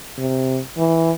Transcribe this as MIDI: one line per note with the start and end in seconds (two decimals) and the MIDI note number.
0.18 0.60 48
0.78 1.11 52